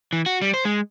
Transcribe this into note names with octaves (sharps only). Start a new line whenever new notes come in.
E3
F#4
G3
C5
G#3